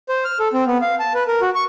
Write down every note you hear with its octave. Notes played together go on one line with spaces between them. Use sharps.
C5
F6
A4
C4
B3
F5
A5
B4
A#4
F#4
C#6